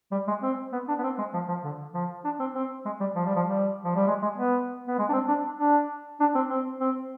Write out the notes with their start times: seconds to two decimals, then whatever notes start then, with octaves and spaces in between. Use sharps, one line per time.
0.12 G3
0.28 G#3
0.42 C4
0.73 B3
0.88 D4
0.99 B3
1.03 C4
1.18 G#3
1.34 F3
1.48 F3
1.64 D3
1.94 F3
2.25 D4
2.40 C4
2.55 C4
2.85 G#3
3.00 G3
3.15 F3
3.26 G3
3.36 F3
3.47 G3
3.84 F3
3.96 G3
4.08 G#3
4.22 G#3
4.38 B3
4.88 B3
4.98 G#3
5.09 D4
5.13 C4
5.28 D4
5.59 D4
6.20 D4
6.35 C4
6.50 C4
6.81 C4